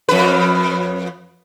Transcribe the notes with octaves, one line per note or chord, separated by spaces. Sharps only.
F2 B4